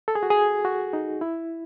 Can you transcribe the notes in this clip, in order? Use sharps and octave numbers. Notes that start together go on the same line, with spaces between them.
A4
G#4
F#4
G#4
F#4
D#4
E4